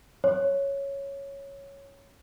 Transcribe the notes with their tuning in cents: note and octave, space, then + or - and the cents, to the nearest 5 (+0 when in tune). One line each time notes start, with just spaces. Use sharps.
C#5 +0